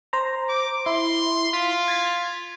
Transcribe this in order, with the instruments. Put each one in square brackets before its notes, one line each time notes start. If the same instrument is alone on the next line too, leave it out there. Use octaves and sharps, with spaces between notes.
[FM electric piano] C5 A#5
[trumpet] D6
[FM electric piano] E4 [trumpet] C6
[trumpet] F4 [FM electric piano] B6
[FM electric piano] G#6 A6 B6